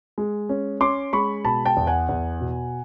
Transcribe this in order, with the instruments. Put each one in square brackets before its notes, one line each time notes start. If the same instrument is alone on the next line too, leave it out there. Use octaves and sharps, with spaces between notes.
[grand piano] G#3
C#4
C#4 C6 D6
G#3 B5 C#6
B2 A5 B5
G5 A5
E2
F#5 G#5
E2
B2